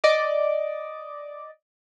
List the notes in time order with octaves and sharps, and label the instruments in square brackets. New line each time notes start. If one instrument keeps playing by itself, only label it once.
[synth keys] D5 D#5 D6